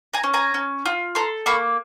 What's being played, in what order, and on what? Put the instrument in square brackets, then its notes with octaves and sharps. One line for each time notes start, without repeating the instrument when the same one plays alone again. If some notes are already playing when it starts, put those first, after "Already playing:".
[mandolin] G#5 A#5
C#4
G#5 A#5
C#4
F4
A4 A#5 C6
A#3 B5 C#6